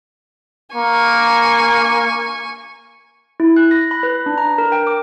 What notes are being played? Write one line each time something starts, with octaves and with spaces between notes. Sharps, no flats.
A#3 G#5 C#6
E4
F#6
A#6
B5
B4
D4
A#5
A#4
G5
D6